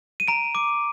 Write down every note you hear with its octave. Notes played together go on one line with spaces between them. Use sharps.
D#7
A#5 D7
D6